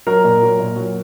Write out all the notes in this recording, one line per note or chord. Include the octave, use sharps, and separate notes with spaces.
F#3 A#4
A#2
F#3
A#2
F#3